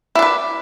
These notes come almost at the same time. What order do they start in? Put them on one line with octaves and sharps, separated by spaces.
E4 D4 B4